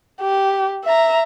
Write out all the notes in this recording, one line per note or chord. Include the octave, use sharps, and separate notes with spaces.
G4
E5 A#5